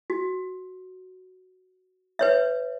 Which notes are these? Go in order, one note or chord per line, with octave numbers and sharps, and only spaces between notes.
F#4
B4 C#5 E5